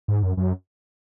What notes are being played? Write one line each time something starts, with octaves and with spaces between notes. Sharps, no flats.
G#2
F#2
F#2